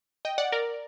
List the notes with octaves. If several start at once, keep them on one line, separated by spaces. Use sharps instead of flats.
D#5 G5
D5 F#5
A#4 D5